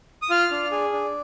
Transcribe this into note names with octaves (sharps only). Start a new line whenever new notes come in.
D#6
F4 F6
D4
G#4
D4